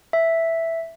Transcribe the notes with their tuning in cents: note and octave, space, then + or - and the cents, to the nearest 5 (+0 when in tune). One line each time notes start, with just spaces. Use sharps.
E5 +0